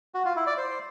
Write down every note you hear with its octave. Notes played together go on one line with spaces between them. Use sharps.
F#4
F4
E4
D5
C5